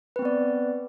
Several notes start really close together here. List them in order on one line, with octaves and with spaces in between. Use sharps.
B4 C4 B3 D5